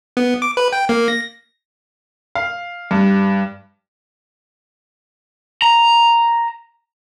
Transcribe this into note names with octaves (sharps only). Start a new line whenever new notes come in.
B3
D6
B4
G5
A#3
A#6
F5
G2
A#5